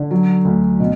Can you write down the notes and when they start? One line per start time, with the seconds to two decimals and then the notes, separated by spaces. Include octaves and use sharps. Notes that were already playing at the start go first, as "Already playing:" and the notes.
Already playing: D3
0.11 F#3
0.45 D2
0.80 B2